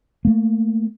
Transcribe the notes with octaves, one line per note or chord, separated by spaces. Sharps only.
A3 A#3